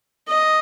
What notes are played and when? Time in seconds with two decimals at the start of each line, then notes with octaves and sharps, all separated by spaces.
0.28 D#5